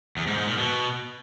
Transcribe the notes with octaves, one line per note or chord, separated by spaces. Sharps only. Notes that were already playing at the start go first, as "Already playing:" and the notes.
E2
G#2
G#2
A#2
B2